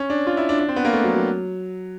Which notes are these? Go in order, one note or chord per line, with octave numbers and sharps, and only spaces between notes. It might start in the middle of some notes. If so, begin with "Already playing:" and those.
Already playing: C#4
D4
F4
E4
D4
D4
C4
B3
A#3
A3
F#3
F#3